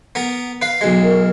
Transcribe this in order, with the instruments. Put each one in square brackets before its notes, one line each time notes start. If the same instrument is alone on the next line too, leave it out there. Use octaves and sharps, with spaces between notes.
[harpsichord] B3 A#4
B4 F5
B1 G#3
[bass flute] A#4